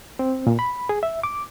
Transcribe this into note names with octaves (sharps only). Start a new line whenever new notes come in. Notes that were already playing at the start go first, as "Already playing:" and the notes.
C4
A#2
B5
G#4
E5
D6